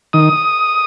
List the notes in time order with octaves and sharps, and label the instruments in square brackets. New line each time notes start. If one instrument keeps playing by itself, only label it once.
[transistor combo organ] D#3 D#6